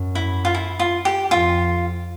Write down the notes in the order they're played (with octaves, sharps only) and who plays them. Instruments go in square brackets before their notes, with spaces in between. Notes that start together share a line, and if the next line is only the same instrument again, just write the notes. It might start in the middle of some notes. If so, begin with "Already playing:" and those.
Already playing: [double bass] F#2
[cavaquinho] E4
F4
E4
F4
G4
[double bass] F2 [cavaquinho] F4